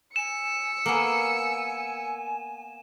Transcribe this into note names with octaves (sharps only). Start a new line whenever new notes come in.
G#5 E6 C#7 E7
A#3 B3 G#5